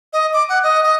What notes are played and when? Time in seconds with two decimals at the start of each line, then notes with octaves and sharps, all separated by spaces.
0.13 D#5
0.34 D6
0.49 F#5
0.63 D#5
0.84 D#5